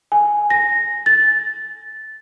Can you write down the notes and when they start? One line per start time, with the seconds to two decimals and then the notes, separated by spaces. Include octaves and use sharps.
0.12 G#5
0.50 A#6
1.06 A6